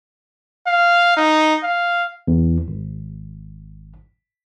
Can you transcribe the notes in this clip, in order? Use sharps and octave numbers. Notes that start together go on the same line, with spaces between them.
F5
D#4
F5
E2
G#1